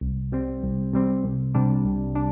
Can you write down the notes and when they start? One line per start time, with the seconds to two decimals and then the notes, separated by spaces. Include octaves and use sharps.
0.01 C2
0.32 C3 G3 C4
0.63 C2
0.93 C3 G3 C4
1.24 C2
1.54 C3 G3 D4
1.85 C2
2.15 D4